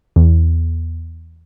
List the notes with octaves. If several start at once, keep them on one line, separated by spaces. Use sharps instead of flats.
E2